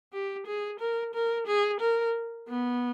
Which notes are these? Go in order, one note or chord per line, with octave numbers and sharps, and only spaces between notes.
G4
G#4
A#4
A#4
G#4
A#4
B3